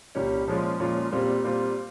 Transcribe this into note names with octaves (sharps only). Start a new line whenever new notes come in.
C2 A#2 G3 C#4
A#2 F3 G#3 C#4 F4
A#2 F3 G#3 C#4 F4
A#2 G3 C4 F4
A#2 G3 C4 F4